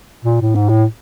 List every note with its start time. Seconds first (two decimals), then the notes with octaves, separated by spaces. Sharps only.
0.25 A#2
0.41 A2
0.55 G#2
0.69 A2